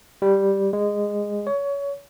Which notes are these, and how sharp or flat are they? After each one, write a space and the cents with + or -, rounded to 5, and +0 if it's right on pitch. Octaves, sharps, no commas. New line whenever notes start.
G3 +0
G#3 -15
C#5 +25